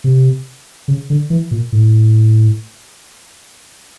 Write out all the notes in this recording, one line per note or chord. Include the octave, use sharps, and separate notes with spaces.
C3
C#3
D3
E3
A#2
A2